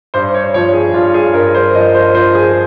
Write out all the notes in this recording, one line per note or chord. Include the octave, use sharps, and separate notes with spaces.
G2 C5
C#5
F3 C#5
G#4
G2 F4
G#4
G2 A#4
C5
F3 D#5
C5
F3 C5
G#4